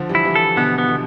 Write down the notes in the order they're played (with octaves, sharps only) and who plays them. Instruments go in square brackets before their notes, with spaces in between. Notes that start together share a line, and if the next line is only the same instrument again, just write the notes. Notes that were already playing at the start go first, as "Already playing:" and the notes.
Already playing: [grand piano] D3 F3
E3 G3
[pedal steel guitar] E4
[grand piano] E3 G3
[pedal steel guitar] A4
[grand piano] B2 D3 [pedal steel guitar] B3
[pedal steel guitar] B3
[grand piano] B2 D3